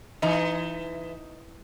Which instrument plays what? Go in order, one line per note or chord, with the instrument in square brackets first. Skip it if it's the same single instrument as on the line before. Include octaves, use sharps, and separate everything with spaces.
[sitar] E3 [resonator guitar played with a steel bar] D#4